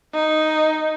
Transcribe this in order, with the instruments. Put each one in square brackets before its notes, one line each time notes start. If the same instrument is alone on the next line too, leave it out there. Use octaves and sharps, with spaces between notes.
[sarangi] D#4